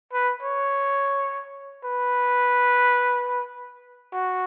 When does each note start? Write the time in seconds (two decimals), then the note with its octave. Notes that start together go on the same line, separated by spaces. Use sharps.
0.13 B4
0.43 C#5
1.85 B4
4.13 F#4